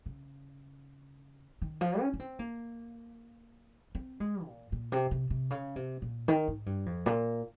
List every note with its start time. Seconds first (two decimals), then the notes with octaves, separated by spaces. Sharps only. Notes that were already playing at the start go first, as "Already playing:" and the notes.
0.06 C#3
1.62 D#3
1.81 F3
2.00 C#4
2.14 C#4
2.20 C4
2.39 A#3
3.95 C4
4.20 G#3
4.46 A#2
4.72 A#2
4.92 C3
5.11 C3
5.30 C3
5.50 C#3
5.76 C3
6.02 A#2
6.28 D#3
6.48 G#2
6.66 G2
6.86 F2
7.06 A#2